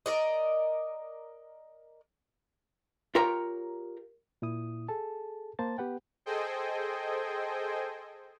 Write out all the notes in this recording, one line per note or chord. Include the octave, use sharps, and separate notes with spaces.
A#4 D5 D#5
F4 G4 A#4 C#5 G5 A#5
A#2 E4 D#6
G#4 A4 A5
A#3 C5 A5 A6
B3 G4 B4 F#5 G5
G#4 A4 C5 D#5 G5 G#5